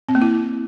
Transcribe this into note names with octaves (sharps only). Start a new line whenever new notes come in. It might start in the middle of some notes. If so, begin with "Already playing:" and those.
C4
A#3
E4